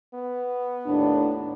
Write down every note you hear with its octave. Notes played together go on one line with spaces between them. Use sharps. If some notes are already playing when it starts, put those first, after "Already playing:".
B3
D#2 A2 D4